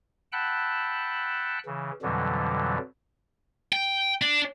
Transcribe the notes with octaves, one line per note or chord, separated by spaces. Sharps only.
F#5 G5 A5 B5 E6 F#6
C#3 E3
F2 B2 D3 E3 F#3 G3
G5
D4